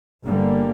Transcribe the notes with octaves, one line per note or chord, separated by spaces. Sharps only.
G1 G2 D3 G3 A#3